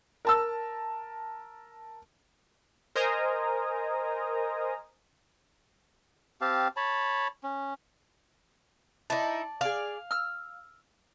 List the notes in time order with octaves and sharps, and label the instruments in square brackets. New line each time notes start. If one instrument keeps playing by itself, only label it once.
[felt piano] A#4 A5 E6
[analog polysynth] A#4 C5 D#5 G#5 A#5 D#6
[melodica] C4 G4 F5 A5
C#5 A5 B5
C#4
[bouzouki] D#4 E4 [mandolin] D5 A5
[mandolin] G#4 D5 [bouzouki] F5
[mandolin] E6 F6